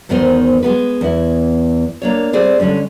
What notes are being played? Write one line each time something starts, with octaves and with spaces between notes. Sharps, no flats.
E2 G#2 D#3 B3 D#4 C5
G#3 B3 B4
E2 E4
A#3 D4 C#5
G3 C4 G#4 D5
D3 G3 G#3 C#4